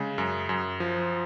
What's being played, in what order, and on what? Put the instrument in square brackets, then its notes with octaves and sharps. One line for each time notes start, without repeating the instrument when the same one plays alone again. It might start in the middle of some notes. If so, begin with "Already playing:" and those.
Already playing: [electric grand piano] C#3 G#3
F#2
F#2
F3